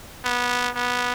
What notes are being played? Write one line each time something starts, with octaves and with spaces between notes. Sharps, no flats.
B3
B3